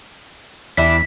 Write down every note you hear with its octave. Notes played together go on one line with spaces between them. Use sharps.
E2 G3 D4 E4 B6